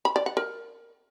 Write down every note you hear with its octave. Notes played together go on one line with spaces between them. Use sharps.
B5
D5
F#5
A#4